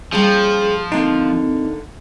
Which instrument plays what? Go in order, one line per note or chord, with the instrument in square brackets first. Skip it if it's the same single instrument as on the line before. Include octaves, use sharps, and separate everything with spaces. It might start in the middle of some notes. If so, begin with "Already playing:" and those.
[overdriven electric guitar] F3 [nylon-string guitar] G3 A#3 C#4 [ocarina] G#4
[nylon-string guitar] D3 A#3 [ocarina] C4 [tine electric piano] D#4